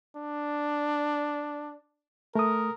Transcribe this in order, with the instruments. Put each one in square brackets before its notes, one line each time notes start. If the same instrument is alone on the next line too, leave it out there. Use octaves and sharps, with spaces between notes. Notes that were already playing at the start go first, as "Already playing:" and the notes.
[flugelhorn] D4
[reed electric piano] A3 D#6 [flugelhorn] A#4